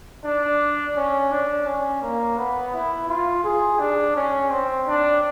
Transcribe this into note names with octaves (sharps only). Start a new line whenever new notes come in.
D4
C#4
D4
C#4
A#3
B3
E4
F4
G#4
D4
C#4
C4
D4